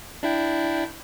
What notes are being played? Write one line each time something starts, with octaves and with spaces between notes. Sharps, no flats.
D4 E4 G5